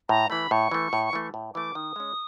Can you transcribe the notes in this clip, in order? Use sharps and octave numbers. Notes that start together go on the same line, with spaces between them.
A2 A#5
E3 A3 B5
A2 C#6
E3 A3
A2
E3 A3
A2
E3 A3 D6
D#3 D#6
G#3 C#4